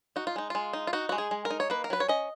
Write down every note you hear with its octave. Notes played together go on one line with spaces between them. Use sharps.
D#4 F#4
F4
G#3 D#4
G#3 F4
D#4
F4
D#4 F#4
G#3 F#4
G#4
G#3
A#4
D#4
C#5
A#3 B4
A#4
F#3 B4
C#5
C#4 D#5